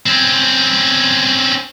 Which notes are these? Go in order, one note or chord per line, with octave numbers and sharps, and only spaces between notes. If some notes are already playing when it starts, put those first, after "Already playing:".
C4 C#4